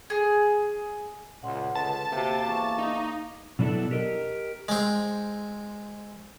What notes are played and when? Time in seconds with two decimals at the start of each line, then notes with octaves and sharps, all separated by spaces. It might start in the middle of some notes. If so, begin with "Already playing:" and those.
0.10 G#4
1.43 C#2 A#2 F#5 C6
1.75 C#2 D3 B4 A5
2.12 C3 A#3 F#4 G4 A4
2.45 E2 C#6 D6
2.78 D#4
3.59 B2 F#3 B3 D4 E4 A4
3.91 G4 A#4 D#5
4.68 G#3 C4